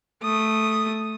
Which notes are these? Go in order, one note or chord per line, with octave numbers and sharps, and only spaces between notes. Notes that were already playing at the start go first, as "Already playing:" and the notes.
A3 D#6